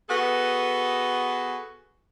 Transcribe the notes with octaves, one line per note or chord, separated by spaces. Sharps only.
B3 F#4 G#4 A4 B4